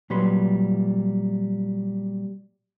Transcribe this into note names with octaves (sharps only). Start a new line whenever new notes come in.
A#2 F#3 G3 B4 C6